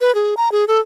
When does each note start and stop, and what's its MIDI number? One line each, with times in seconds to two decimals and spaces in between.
0.01 0.14 71
0.15 0.35 68
0.37 0.52 82
0.52 0.65 68
0.68 0.80 69